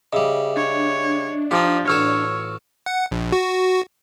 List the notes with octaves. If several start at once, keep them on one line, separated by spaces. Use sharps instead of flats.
C#3 G3 D#5 E5
D4 C#5
F3 D#4 G4
A1 F#4 A4 C#5 C#6 E6 F6
F#5
A#1
F#4